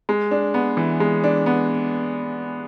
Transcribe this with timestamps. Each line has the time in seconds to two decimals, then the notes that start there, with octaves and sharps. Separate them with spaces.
0.09 G#3
0.31 D4
0.54 B3
0.77 E3
1.00 G#3
1.24 D4
1.46 B3